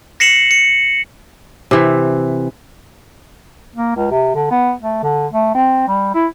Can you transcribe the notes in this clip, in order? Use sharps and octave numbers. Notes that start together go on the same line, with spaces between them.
A#6 C7 C#7 E7 F#7
C#7
C3 E3
A#3
C#2
C3
D3
B3
A3
D3
A3
C4
G3
E4